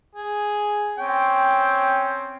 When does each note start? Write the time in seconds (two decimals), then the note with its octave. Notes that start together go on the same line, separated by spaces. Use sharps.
0.15 G#4
0.99 C4 C#4 G5